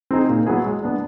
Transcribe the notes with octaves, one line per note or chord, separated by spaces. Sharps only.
C4 D#4 G#4
A#2
F#3 B3 E4 G#4
G#3
B3 D4